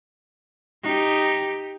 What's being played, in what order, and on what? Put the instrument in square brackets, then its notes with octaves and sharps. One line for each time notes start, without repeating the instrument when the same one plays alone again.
[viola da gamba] D#4 G4